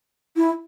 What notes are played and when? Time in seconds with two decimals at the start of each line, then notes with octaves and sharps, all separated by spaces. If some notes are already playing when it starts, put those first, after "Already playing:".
0.36 E4